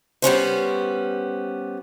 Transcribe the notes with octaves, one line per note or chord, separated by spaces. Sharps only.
G3 B3 C#4 C5